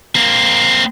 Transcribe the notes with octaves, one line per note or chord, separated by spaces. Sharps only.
A#3 C4